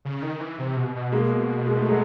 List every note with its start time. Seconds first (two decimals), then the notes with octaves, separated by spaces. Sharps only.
0.05 C#3
0.22 D#3
0.40 E3
0.59 C3
0.76 B2
0.95 B2
1.12 G#3 A#3
1.67 G#3
1.77 A3
1.88 F#3 G#3